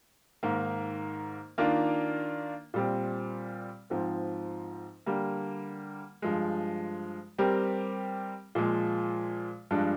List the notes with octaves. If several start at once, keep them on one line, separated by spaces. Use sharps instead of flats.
G#2 D#3 A#3
D#3 A#3 D4 F4
A#2 G3 C4
G#2 F3 C4
D3 G3 A#3
G2 F3 G#3
G3 C4 G4 A#4
A#2 F3 G#3
G2 F3 G#3 D4